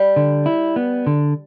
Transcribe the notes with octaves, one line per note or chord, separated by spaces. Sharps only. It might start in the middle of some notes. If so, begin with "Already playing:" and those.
Already playing: G3
D3
E4
B3
D3